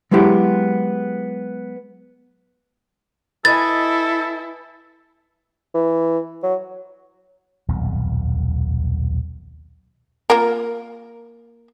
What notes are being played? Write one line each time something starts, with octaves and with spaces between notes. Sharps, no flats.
F#3 G#3 B3 E4 G4
E4 A4 B4 D#5 G#5 A6
E3
F#3
D#1 B1 F2
A#3 F4 A#4